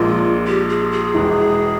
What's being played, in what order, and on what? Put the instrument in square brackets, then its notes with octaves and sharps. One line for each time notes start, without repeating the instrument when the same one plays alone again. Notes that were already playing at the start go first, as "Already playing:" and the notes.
Already playing: [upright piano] A#1 A#2 G#3 [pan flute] F4
[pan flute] G4
G#4
G#4
[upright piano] E1 E2 E3